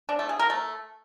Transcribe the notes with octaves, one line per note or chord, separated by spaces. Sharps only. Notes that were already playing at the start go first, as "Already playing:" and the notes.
D4
A3
G#4
A#4
A3